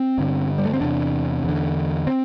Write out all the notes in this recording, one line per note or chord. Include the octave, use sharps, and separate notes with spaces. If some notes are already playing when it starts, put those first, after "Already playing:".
Already playing: C4
G2 D3
G3
A3
C4
E2 C3 D4
E2 D3
C4